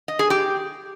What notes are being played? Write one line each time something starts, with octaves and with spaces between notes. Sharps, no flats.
D#5
G#4
G4